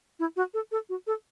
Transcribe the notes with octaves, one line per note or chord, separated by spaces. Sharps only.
E4
F#4
A4
A4
F#4
A4